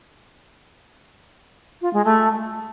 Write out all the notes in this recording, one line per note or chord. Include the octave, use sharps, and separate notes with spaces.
F4
G#3
A3